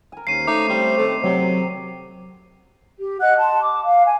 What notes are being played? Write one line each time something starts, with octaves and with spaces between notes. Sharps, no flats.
A#4 G#5
D#2 C#4 C5 F5 C7 D#7
A3 D#4 D6
G3 C4
D#3 A3 C4 C#6
C3 F#3 G5
G4
D#5 F#5 F#6
A5 C6
D6
F5
G#5